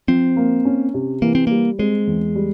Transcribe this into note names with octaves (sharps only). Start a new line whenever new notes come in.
F3 C4
A#3
C#4
C3
E3 A#3
C4
G3 A#3
G#3 C4
E2
G3